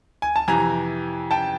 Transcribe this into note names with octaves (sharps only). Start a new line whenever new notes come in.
G#5
A5
F2 C3 E3 G#5 A#5
G5 A5